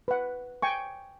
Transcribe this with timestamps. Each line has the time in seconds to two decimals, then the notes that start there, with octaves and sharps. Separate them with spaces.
0.08 B4 F#5
0.62 G5 G#5 C#6